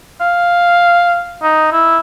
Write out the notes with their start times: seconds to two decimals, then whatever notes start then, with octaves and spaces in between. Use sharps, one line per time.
0.21 F5
1.42 D#4
1.72 E4